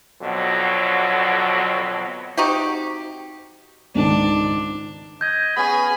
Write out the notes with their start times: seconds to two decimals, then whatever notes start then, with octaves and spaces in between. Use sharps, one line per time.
0.22 F2 B2 D3 F#3
2.37 C4 D#4 F#4 G4
3.95 C#2 G#2 D#3 D4
5.21 D#5 G6 G#6
5.56 B3 C#4 G#4 B5